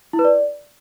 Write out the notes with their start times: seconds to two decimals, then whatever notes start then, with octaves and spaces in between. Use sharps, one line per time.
0.13 E4
0.19 B4
0.25 D5